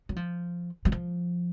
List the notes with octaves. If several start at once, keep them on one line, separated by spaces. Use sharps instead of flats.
F#3
F3
F#3
F3